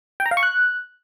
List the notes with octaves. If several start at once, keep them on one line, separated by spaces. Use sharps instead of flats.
G5
A#5
F5
C#6
F#6